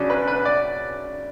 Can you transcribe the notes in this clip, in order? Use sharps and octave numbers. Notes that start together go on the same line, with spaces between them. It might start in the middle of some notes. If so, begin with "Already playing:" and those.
Already playing: C#3 F#3 C#4 D4
B4
B4
D5